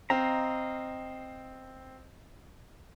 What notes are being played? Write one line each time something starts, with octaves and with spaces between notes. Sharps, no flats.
C4 D#5 F5 A#5